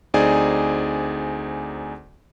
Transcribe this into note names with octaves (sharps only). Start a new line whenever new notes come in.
D2 C4 D#4 G#4 D5 G#5